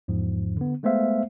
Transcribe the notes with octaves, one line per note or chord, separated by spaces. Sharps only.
E2 G#2 F3
D3 B3
G#3 A3 B3 C5 E5 F5